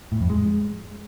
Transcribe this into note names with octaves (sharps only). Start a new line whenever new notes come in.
A2
F2
G#3